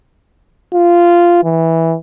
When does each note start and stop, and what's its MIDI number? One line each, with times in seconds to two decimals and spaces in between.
0.74 1.43 65
1.44 1.96 52